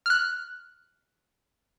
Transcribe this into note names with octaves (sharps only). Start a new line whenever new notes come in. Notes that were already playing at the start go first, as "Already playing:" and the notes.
F6 F#6